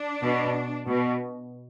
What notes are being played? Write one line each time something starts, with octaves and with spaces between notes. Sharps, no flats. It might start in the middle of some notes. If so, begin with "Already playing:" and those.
Already playing: D4
B2
B2